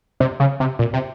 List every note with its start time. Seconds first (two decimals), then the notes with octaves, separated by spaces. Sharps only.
0.20 C3
0.40 C#3
0.60 C3
0.79 A#2
0.93 C3